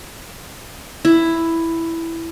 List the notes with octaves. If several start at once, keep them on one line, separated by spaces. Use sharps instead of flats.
E4